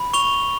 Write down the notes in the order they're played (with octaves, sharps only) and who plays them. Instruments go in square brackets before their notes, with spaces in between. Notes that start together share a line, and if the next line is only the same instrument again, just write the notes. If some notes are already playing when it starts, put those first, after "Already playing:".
Already playing: [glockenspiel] B5
C#6 F7 G7